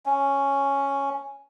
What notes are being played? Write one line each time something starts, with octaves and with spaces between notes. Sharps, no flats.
C#4